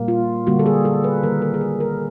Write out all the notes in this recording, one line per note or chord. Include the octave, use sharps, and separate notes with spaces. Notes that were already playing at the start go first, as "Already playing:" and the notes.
Already playing: A#2 G3 A#3
F4
D3 G3 A#3 F#4
A4
G#4
A4
B4
D#3 G3 A#3 A#4
A#4
G#4
A4
A#4